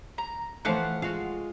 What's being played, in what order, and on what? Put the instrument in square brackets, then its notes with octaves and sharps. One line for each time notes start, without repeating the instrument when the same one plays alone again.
[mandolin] A#5
[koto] E3 F3 F5 [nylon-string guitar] A3 C5 [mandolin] F#5
[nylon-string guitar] G#3 F4 G#4 [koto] F#4 F5